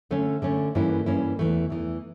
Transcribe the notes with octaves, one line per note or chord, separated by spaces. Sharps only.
D3 A3 C#4
D3 A3 C#4
G2 E3 A#3 C#4 E4
G2 E3 A#3 C#4 E4
E2 E3 A3
E2 E3 A3